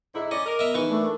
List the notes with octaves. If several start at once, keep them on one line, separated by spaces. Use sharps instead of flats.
G#2 D3 E4 G#4 D#5 A#5
C#4 D5 D#5 D6
A#4
B3 D#5 E5
E3 D#4 G#4 C#6
A3 D4 A#4